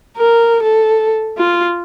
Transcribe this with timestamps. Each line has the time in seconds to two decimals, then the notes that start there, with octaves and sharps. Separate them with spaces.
0.17 A#4
0.63 A4
1.38 F4